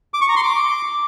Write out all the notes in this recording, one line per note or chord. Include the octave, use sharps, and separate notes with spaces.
D6
C#6
A#5
C6
D6